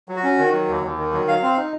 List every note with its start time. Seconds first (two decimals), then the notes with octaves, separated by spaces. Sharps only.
0.09 F#3
0.16 F#4
0.23 C#4
0.38 D#3
0.53 F#3
0.69 D#2
0.83 D#2
0.98 D#3
1.13 F#3
1.27 F#3 F5
1.42 C4
1.58 D#4